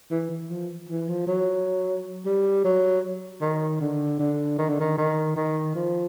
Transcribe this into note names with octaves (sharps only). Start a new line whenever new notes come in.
E3
E3
F3
E3
F3
F#3
G3
F#3
D#3
D3
D3
D#3
D3
D#3
D#3
D#3
F3